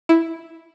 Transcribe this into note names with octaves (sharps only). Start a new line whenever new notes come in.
E4